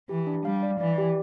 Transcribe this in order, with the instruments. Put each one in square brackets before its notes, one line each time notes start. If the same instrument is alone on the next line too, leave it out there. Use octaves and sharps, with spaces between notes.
[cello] E3 [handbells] G4
[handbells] D4
[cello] G3 [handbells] F5
[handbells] D5
[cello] E3 [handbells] D5
[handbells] G4